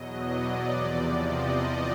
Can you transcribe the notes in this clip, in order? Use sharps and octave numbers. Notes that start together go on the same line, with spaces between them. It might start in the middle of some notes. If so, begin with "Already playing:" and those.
Already playing: E2 B2 F#3 D#5
D5
E2 C3 F3
D#5